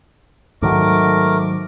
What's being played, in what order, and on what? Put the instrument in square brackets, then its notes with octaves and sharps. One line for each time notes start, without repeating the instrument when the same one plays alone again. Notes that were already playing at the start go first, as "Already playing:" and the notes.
[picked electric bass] G#2 D#3 F#3 [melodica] A3 A#4 D6